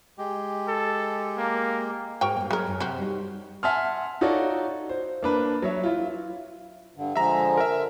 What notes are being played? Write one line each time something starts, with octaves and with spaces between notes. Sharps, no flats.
G#3 G4
A4
A#3
G#2 F#4 A#4 G5
G2 A#3
F#3 G#3 A#4
F#2
C3 F#4 C5
G3 D#4
E5 F#5 G#5 A5 C6 F6
D#4 F4 F#4 A4 C#5 D5
C5
A#3 D4 B4
F#3 C#5 E5
E4 F4
G2 D3
D3 F3 G#3 E5 A#5
A#4 E5